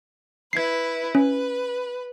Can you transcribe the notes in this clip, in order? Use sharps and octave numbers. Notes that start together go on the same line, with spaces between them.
E4 B4 G#6 C7
C#4 B4